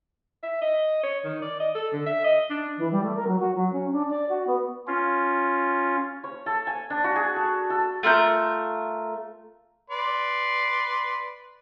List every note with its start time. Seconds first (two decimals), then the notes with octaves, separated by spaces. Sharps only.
0.43 E5
0.61 D#5
1.03 C#5
1.25 D#3
1.42 D5
1.60 D#5
1.75 A4
1.93 D3
2.06 E5
2.24 D#5
2.50 D4
2.77 E3
2.91 G3
3.03 A3
3.15 A#4
3.27 F#3
3.39 F#4
3.55 F#3
3.72 C#4
3.92 D4
4.10 D5
4.29 F#4
4.47 B3
4.87 C#4 F4
6.24 C#5
6.46 A4
6.67 G#5
6.90 D4
7.04 F#4
7.16 G#4
7.36 A4
7.70 A4
8.03 A3 F4 A#4 G6
9.90 B4 D5 C6